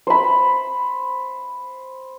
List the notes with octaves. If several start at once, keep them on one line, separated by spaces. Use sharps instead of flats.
C5 B5